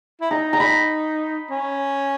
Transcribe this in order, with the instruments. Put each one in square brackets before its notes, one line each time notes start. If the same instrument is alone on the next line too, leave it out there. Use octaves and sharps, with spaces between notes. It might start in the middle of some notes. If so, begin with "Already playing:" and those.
[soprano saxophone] E4
[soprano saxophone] D#4 [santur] A#5
[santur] A#5
B5
[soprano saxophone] C#4